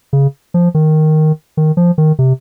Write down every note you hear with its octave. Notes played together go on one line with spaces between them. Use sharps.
C#3
F3
D#3
D#3
F3
D#3
C3